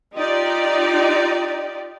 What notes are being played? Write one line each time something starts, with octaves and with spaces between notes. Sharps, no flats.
D#4 F4 G4 D5